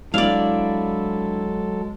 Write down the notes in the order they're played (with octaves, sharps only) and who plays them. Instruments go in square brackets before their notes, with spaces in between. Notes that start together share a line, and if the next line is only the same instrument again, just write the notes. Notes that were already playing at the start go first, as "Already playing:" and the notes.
[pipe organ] F#3 A4 [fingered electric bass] G#3 [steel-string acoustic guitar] D4 E4 [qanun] D5 F5